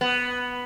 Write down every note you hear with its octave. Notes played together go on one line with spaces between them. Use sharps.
B3